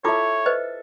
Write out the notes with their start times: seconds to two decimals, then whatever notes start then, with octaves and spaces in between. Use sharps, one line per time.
0.04 E4 F4 A4 C#5 E5 D6
0.46 B4 C5 D#5